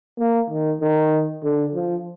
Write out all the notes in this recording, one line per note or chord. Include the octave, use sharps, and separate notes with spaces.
A#3
D#3
D#3
D3
F3